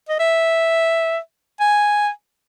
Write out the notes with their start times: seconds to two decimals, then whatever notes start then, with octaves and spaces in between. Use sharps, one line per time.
0.09 D#5
0.20 E5
1.60 G#5